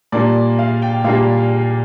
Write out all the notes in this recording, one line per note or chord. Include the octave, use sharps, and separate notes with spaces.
A#2 G3 A#3 D4 D5
F5
G5
A#2 G3 A#3 D4 F5